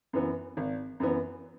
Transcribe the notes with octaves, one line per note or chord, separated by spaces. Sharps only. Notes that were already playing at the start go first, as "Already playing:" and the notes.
F#2 E3 B3
G#1
F#2 E3 B3